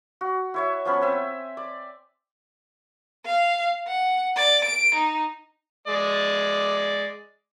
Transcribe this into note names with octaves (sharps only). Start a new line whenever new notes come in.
F#4
E4 C#5 E5
F3 B3 C#4 B5
C4 E5 G#5
D5
F5
F#5
D5
D7
D#4
G#3 D5